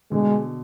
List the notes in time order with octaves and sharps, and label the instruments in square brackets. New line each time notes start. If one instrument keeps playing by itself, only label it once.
[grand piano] B2 D3 [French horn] G#3